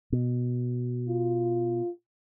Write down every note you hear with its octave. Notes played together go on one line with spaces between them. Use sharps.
B2
F4